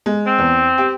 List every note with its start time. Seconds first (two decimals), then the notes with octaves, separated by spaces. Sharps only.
0.06 G#3
0.27 C4
0.39 E2
0.78 G4